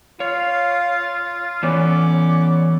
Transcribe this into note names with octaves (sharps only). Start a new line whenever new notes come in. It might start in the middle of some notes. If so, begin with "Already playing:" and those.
F4 C#5 F5
E3 A3 B3 C#4 D5